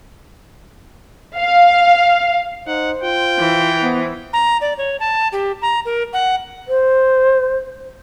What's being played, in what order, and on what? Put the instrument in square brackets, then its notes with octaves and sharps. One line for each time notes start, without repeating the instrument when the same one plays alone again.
[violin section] F5
[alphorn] D#4 [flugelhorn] C5 [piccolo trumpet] F#5
[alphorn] F4 [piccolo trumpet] G5
[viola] E3
[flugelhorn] B3 [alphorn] C5
[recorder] A#5
D5
C#5
A5
G4
A#5
A#4
F#5
[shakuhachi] C5